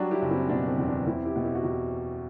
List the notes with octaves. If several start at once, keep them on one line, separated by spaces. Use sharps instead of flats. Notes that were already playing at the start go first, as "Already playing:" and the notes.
Already playing: F#3 G3 D4 F#4
E4 G4
F#1
C4 E4
B2 D4
C4
E2
D4
E2 C4 E4
E4 G4
B2
E4 G4
F#4
E2 E4 G4